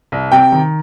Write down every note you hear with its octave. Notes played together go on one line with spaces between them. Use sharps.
C2
C3 G5
D#3